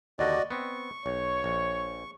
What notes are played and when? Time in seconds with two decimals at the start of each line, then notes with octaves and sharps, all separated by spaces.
0.19 D#2 D3 F#4 D5 D#5
0.51 B3 C4 C#6
1.06 B1 C#5
1.44 A#1